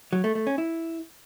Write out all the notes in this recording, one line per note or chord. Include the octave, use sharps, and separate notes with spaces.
F#3
A3
A3
C#4
E4